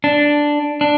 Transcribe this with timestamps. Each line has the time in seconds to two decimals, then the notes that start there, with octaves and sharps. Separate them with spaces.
0.04 D4
0.81 D4